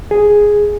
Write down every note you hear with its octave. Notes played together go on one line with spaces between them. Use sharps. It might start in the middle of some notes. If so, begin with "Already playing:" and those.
G#4